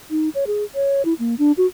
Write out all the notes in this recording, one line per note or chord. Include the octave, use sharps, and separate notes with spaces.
D#4
C#5
G#4
C#5
E4
A#3
D4
F#4